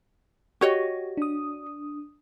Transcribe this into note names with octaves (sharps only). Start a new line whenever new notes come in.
F#4 G4 C#5 D#5
D4 D#6